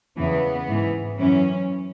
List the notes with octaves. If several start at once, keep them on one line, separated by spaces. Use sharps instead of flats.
E2 C#3 E3 B3
G#2 E3
F#2 E3 C#4